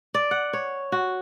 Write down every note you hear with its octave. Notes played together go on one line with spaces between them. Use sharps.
D5
F#5
C#5
F#4